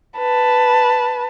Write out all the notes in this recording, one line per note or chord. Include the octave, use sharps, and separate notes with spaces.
B4 A5